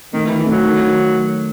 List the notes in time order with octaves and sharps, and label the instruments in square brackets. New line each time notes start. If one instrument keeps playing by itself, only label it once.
[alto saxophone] D#3 [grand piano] A3
[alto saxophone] E3
[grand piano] D#3
[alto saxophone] E3
[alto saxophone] F#3 [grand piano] A3
[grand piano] D#3
D#3